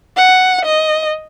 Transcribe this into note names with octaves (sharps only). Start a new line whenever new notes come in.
F#5
D#5